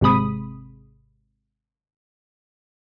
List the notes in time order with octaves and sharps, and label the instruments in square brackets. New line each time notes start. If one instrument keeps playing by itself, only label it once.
[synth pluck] G#1 C3 G#3 B5 D#6